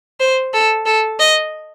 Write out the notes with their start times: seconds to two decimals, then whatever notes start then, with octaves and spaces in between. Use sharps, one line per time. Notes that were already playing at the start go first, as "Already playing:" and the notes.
0.20 C5
0.54 A4
0.86 A4
1.19 D#5